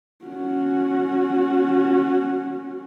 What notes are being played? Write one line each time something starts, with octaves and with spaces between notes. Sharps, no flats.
C#4 F#4